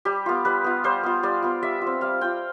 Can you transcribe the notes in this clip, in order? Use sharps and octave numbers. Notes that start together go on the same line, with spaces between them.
G3 G4
B3 F4
G3 B4
B3 F4
G3 C5
B3 F4
G3 D5
B3 F4
G3 E5
F4
C4
G3 F5
C4 F4 G5